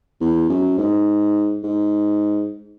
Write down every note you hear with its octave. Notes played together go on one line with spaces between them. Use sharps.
E2
F#2
G#2
G#2